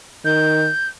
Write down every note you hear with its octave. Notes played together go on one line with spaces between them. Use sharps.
D#3 G6